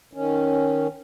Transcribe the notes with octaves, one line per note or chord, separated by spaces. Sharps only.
D#3 C#4